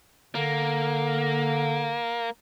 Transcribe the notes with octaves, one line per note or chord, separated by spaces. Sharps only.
D3 A#3